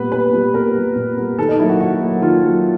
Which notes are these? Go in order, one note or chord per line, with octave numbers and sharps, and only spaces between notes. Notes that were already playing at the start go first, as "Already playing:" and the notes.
Already playing: A#2 G3 B3 B4
A#2 B4
G3 B3
A#2 A#4
G3 B3
A#2
G3 B3
D#3 A4
D#4
F#3 A#3 E4
F#4
D#3 F#4
F#3 A#3
D#3 F4
F#3 A#3